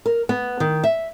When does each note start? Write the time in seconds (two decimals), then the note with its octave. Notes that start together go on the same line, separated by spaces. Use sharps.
0.06 A#4
0.29 B3
0.60 D#3
0.84 E5